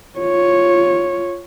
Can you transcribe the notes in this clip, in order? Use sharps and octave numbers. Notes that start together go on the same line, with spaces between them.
F4 C#5